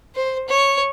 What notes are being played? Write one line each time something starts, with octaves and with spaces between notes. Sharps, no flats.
C5
C#5